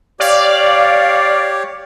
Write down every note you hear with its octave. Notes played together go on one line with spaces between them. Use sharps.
G4 C#5 D5 F5